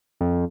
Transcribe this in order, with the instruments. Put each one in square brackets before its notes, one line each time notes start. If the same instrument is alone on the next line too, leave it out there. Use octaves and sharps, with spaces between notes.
[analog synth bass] F2